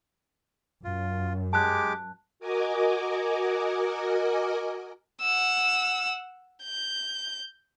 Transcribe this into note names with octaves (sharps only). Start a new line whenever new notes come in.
F#2 F4
G#3 G4 A5 D6 F#6
F#4 A#4 D#5 G#5 D6
F#5 E6
G6